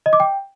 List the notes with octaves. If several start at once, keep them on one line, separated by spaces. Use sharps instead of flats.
D#5
D6
G5